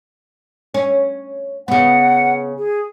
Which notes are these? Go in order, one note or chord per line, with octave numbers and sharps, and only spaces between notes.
C#4
C#3 B3 F#5
G#4